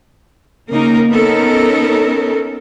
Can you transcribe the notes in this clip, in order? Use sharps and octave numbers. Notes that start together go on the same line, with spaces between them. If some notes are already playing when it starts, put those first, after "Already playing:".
C#3 A#3 D#4 A#4
B3 C#4 D#4 A4 A#4